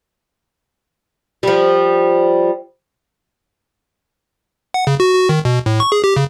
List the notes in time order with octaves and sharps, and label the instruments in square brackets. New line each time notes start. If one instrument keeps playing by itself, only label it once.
[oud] F3 G3
[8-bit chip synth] F#5
C#3
F#4
F#4
D#3
B2
A2
C#6
G#4
G4
C#3